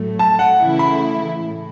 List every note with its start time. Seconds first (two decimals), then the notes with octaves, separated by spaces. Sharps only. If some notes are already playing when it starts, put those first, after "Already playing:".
Already playing: A2 F#3 A3
0.19 A5
0.39 F#5
0.59 C#3 E3 A3 E4
0.79 B5
1.40 A2